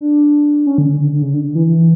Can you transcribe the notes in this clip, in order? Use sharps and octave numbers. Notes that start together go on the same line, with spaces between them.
D4
C#4
D3
D3
D3
D3
C#3
D3
D3
E3
E3